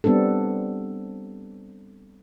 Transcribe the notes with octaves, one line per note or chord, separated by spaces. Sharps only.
G3 B3 C4 D4 A4